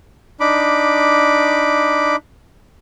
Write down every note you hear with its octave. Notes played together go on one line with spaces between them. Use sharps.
D4 D#4 B5 D6